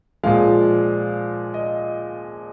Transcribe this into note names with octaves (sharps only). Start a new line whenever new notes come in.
A#2 F3 G#3 F5
D#5